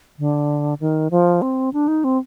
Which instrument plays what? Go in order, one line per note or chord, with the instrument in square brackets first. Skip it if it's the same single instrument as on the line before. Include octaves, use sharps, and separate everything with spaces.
[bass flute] D3
D#3
F3
C4
D4
D#4
C4